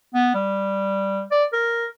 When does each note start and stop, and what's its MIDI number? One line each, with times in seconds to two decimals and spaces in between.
0.14 0.29 59
0.34 1.23 55
1.31 1.45 74
1.53 1.86 70